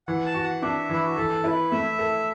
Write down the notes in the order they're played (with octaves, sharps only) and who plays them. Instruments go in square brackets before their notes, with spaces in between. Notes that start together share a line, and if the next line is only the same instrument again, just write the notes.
[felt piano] E3 [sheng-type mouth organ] F#5
[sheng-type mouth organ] A5
[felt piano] F#4
[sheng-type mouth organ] F#5
[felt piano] D4 [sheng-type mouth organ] E5
[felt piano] E3 [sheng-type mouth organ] E4
[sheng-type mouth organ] F#4
[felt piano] E3 [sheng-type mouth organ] A4
[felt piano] E4 [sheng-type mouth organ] B4
[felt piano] A3 [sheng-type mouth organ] E5
[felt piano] A4